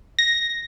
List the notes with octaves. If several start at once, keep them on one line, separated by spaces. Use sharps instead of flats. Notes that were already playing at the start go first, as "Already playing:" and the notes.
A#6